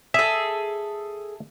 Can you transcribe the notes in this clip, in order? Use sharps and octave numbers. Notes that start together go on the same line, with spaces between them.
G#4 A4 E5